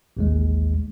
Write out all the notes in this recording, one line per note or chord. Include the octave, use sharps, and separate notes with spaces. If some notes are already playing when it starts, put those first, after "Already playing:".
A1 D#2 G#3